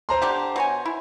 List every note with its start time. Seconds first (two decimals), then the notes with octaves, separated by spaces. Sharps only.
0.09 C5 A#5 C6
0.22 D3 D4 G4
0.56 B2 C#5 G#5
0.86 E4